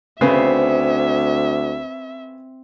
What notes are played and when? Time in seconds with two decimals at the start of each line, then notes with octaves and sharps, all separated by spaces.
0.21 D2 C#3 B3 C4 E5